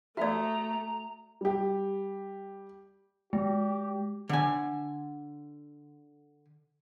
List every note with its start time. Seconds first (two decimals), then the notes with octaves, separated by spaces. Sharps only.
0.17 A3 F#4 D5 E5 A#5 D#6
1.41 G3 G4
3.33 G#3 G4
4.29 D3 G#5